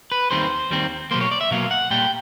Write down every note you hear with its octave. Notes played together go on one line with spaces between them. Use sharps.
B4
D#2 D#3 G3 C4 C5
D#2 D#3 G3 C4
B2 F#3 A#3 C5
C#5
D5
E5
B2 F#3 A#3 F5
F#5
A#2 G3 A#3 G5